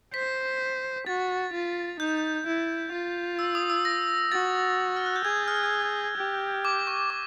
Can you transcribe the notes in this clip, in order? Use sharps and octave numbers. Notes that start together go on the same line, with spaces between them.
C5 B6
F#4 A6
F4
D#4 G6
E4
F4
E6
D#6
E6
A#6
F#4 A6
F6
F#6
G6
G#4 G#6
F6
G4
D6
C#6
D6